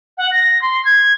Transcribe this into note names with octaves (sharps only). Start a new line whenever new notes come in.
F#5
A#6
C6
G#6